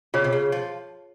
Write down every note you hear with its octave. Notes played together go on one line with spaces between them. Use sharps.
C#3 F4 G#4 C#5
C3
C#3
F3